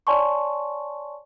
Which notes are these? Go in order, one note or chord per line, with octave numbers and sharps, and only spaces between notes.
C#5 D5 G#5 A5 C6 C#6